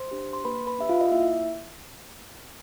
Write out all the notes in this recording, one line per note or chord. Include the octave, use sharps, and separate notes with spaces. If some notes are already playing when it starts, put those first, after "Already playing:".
Already playing: C5 C6
D4 G4
C6
A#3 B4 B5
B4 B5
D4 G4 E5
F4 F5
D#5
A#3 E4 E5